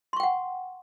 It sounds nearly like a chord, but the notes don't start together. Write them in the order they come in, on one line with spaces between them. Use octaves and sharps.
C6 C#6 G5 F#5